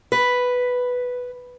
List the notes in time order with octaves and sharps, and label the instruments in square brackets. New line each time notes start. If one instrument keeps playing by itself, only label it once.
[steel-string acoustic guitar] B4